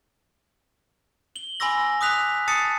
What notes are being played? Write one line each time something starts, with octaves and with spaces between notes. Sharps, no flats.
F#7 G7
G#5 B5 C6 D6 E6 A#6
D6 D#6 F#6 B6 F7
A5 D#6 A6 C7 C#7